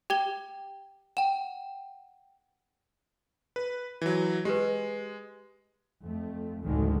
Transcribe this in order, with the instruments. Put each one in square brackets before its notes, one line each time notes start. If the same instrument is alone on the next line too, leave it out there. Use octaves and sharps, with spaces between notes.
[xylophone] G4 G#6 G7 [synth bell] G5
[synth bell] F#5 G5 [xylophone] E7
[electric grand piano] B4
E3 F#3
[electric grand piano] G#3 [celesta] G4 B4
[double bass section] F2 A3
F#1 D2 A2 D3 D#3 G#3